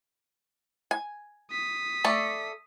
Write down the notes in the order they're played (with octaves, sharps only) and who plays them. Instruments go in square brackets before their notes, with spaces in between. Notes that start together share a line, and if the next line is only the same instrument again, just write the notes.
[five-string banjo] G#5
[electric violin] D#6 B6
[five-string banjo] A3 A4 D5